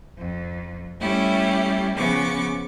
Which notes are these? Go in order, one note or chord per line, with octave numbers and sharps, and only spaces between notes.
F2
G3 A3 C#4 E4 G4
C#3 F3 B3 C#6 D6